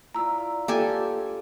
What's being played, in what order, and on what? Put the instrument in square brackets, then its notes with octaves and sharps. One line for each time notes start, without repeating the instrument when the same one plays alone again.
[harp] E4 F4 D5 [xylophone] A#5 E6
[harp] A#3 D4 F4 [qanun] G4 A4 G#5